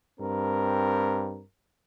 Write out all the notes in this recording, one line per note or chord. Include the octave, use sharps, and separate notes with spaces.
G2 C4 A#4